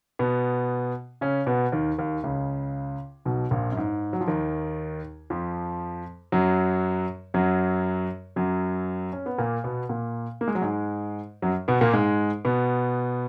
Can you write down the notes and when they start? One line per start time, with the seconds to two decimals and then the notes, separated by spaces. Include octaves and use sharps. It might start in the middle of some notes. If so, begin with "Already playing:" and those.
0.19 B2 B3
1.21 C#3 C#4
1.47 B2 B3
1.72 D#2 D#3
1.98 D#2 D#3
2.24 C#2 C#3
3.25 B1 B2
3.51 A#1 A#2
3.72 F#2
3.77 G#2
4.13 F#3
4.21 F3
4.27 D#2 D#3
5.30 F2 F3
6.32 F#2 F#3
7.34 F#2 F#3
8.36 F#2 F#3
9.13 C#4
9.26 B3
9.38 A#2 A#3
9.64 B2 B3
9.89 A#2 A#3
10.41 A#3
10.48 G#3
10.55 F#3
10.62 G#2 G#3
11.42 F#2 F#3
11.68 B2 B3
11.81 A#2 A#3
11.93 G#2 G#3
12.45 B2 B3